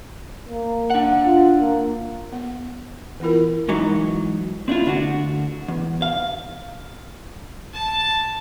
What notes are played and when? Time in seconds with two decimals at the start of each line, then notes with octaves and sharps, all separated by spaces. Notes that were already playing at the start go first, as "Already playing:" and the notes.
0.49 A#3
0.90 D4 F#5
1.26 F4
1.61 A#3
2.33 B3
3.20 E3 B3 E4 F4 A#4
3.68 G#2 E3 F#3 D#4
4.68 C4 D4 E4 F4
4.86 D2 D4 F#4
5.68 E2
6.02 F5
7.74 A5